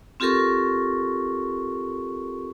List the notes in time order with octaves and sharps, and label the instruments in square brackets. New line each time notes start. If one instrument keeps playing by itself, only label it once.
[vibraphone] C4 F4 G4 A4 A#4 C#6